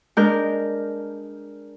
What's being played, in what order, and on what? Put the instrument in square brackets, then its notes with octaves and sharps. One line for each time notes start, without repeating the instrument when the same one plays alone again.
[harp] G#3 D4 A#4 G6